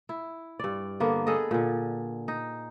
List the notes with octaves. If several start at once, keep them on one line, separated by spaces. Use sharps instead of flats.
E4
G2 D5
D3 A#3 B3
G#4 A4 B4 D#5
A#2 D3
D#4